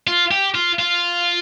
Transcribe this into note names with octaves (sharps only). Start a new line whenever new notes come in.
F4
G4
F4
F4